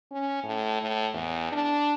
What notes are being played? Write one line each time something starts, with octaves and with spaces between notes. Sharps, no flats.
C#4
A2
A2
E2
D4